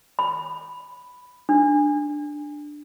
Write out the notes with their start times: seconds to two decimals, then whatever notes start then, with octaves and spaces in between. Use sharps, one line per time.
0.19 B5
1.49 D4